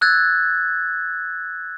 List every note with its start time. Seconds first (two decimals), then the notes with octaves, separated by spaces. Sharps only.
0.01 E6 F#6 G#6 A6